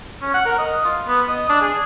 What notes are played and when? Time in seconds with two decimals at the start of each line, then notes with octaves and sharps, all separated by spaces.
0.22 C#4
0.34 F#5
0.45 A#4
0.58 D#5
0.85 F4
1.07 B3
1.29 D#5
1.49 D4
1.61 G#4